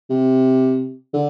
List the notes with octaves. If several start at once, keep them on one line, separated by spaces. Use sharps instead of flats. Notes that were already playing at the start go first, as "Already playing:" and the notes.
C3
D3